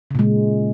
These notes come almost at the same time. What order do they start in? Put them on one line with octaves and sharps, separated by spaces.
C#3 A#2 G#3